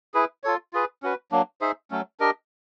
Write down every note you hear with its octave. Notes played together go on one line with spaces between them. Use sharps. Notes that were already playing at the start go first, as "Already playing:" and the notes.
E4 G#4 B4
F4 A4 C#5
F4 G#4 B4
C#4 F#4 B4
F#3 A#3 D4
D#4 G#4 C5 E5
F#3 A3 C#4
D4 G4 A#4 D#5